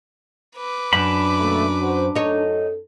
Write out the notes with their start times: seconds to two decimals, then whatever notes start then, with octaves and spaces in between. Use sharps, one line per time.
0.56 B4 D6
0.93 F#2 D4 B5
1.40 B2 A3 A#3
1.81 F#4 C5
2.15 F#2 D#4 A4 C#5